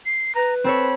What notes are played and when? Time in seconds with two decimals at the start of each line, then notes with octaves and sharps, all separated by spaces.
0.05 C7
0.35 B4 A#5
0.64 C4 A4 C#5 B5